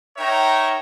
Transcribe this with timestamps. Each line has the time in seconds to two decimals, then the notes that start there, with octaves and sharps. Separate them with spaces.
0.17 D#4 A#4 C#5 E5 G5 A#5